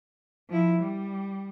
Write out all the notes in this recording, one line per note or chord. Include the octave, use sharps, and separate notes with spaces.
F3 E4
G3